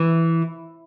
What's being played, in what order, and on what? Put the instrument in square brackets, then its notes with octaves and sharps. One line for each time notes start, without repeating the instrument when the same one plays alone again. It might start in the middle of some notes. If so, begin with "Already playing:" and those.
Already playing: [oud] E3